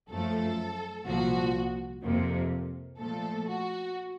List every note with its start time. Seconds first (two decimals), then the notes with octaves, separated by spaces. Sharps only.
0.10 F#2 F3 A3 A4
1.06 C2 A#2 F3 F#4
2.03 F2 C3 F3 A#3
2.99 A#2 F3 A3 A4
3.47 F#4